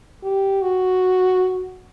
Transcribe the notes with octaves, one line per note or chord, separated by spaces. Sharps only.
G4
F#4